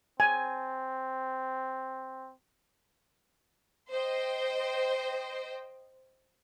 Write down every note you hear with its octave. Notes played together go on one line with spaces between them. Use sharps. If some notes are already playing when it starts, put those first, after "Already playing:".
C4 G#5
C5 D#5 G5